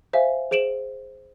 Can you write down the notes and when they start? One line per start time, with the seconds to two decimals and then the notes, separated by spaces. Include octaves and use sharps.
0.13 C5 E5 F5 G#5
0.51 G#4 C5 D7 E7 F#7